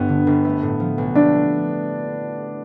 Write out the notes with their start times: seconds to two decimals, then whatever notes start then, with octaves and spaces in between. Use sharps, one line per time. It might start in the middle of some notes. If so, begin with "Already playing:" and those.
Already playing: G1 G2 B3
0.09 D3
0.27 G1
0.45 A3
0.63 A2
0.80 F3
0.98 B1
1.15 A3 D4